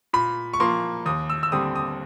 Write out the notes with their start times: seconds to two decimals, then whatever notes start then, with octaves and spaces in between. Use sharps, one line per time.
0.13 A#2 B5
0.54 C#6
0.60 F3 A#3 C6
1.06 D#2 D#6
1.30 E6
1.43 E6
1.52 D3 G3 C4 D#6
1.75 D#6